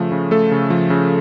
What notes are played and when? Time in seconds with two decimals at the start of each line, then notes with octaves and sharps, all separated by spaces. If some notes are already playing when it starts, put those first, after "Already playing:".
Already playing: C#3 F3 A3
0.12 C#3
0.31 A3 A4
0.51 C#3
0.70 F3
0.90 C#3